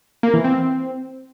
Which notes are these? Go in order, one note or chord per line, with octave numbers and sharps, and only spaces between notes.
A#3
E3
C4